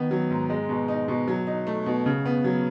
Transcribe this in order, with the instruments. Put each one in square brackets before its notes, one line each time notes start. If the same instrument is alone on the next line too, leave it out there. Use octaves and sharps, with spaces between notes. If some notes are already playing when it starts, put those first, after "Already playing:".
Already playing: [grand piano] D#3 B3
F#3
G#2
G#3
B2
D#4
B2
F#3
D#4
A3
B2
C#3
B3
F#3